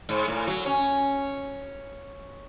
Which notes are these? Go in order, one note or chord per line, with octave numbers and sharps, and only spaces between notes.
G#2
A2
F#3
C#4